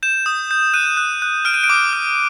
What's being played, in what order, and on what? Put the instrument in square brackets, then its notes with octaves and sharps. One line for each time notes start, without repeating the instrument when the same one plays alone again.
[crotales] G6 E7
D#6
G6
F#6 D#7
F#6
F#6
F6 D7
D#7
D7
D6
F6